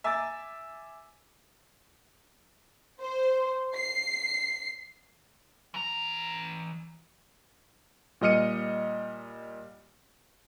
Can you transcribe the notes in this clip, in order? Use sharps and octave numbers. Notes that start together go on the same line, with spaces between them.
E5 G#5 A#5 D6 E6 A6
C5
C7
E3 A#5
A#2 G3 D#5 F6 C#7 D#7